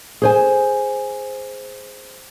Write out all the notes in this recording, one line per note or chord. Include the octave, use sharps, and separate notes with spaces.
G#4 C5 G#5